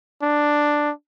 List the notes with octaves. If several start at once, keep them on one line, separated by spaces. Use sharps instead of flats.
D4